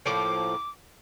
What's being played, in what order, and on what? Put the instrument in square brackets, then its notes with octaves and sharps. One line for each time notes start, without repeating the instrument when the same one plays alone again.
[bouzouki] A2 F3 A#3 [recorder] D6